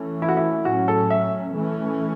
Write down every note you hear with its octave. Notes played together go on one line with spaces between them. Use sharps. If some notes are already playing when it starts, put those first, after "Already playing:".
Already playing: E3 A3 C#4
E4
F#4
E4
A2 F#3 C#4 F#4
A4
E5
E3 A3 C#4